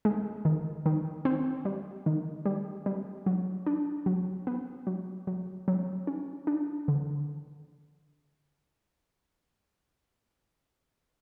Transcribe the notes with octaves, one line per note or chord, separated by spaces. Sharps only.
G#3
D#3
D#3
C4
G3
D#3
G3
G3
F#3
D4
F#3
B3
F#3
F#3
F#3
C#4
D4
D3